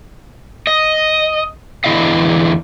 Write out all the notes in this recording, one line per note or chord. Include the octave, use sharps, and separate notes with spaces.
D#5
E2 D3 E4 D#5 F5